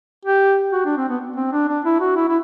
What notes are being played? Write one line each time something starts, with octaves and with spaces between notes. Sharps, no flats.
G4
F#4
D4
C4
B3
C4
D4
D4
E4
F#4
E4
E4